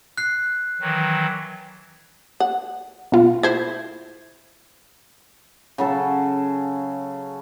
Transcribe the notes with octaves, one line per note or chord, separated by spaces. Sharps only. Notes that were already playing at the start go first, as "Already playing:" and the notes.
F#6 C7
D#3 E3 F#3
F#5
B2 F4
E4 C5 G#6
C#3 F#3 A4